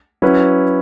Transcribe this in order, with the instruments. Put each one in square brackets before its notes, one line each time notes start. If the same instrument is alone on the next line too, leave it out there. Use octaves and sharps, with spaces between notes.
[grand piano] F#3 C#4 E4 B4